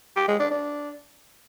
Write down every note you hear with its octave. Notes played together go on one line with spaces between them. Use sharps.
G4
G#3
D4
D4